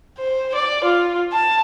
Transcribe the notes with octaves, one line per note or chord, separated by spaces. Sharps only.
C5
D5
F4
A5